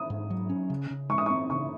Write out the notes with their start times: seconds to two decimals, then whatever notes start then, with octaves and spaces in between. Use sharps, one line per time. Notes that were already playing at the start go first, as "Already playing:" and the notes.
Already playing: D#6
0.10 G#2
0.30 F#3
0.50 C#4
0.70 C#3
0.90 C#3
1.09 G#3 C#6
1.18 D#6
1.26 C4 C#6
1.50 C#3 C#6